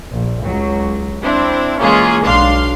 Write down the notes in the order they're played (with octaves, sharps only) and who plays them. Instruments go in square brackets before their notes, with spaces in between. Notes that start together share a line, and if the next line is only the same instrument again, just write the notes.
[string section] A#1
C#2 F#3
C4 D4 E4
E3 G#3 A#3 C#4 F4 G#4
B1 D4 F5 C6